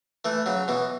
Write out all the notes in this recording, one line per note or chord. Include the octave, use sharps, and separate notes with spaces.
E3 A3
C#3 F#3
B2 E3